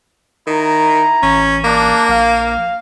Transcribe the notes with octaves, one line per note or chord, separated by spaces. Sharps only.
D#3 E4 A#5
A1 C#4
A#3 D4
A#1 F5